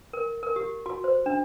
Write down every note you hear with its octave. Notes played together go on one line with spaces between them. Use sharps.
A#4
A#4
G4
F#4
C5
D4